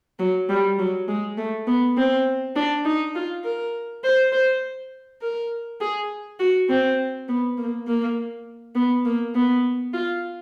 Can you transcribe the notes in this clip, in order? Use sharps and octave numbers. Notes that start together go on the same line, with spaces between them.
F#3
G3
F#3
G#3
A3
B3
C4
D4
D#4
F4
A#4
C5
C5
A#4
G#4
F#4
C4
B3
A#3
A#3
B3
A#3
B3
F4